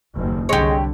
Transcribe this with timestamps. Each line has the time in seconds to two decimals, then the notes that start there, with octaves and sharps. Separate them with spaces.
0.13 F#1 D#2
0.49 C2 D3 G#3 G4 C#5